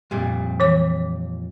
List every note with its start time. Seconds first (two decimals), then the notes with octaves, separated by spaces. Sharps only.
0.11 F2 A#2 G3
0.60 E3 C#5 D6